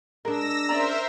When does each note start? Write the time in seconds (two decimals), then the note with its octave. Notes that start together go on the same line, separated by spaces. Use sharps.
0.25 G#3 D4 A#4 E6 A#6
0.69 C#4 A#4 C5 D5 E5 A#5